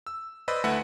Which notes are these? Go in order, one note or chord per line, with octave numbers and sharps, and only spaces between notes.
E6
B4 C5 D5 D#5 B5 E6
D2 A3 E4 B4 F#5 B5